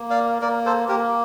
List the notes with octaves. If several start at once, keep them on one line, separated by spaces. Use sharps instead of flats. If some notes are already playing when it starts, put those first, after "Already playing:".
Already playing: A#3
D5 F5
A#3 A#4 D5
A4 C5
A#3 G4 A#4